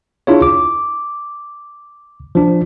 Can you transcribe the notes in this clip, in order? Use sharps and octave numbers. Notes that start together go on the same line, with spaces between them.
D4 E4 F4 G#4 C#5
D6
F3 D4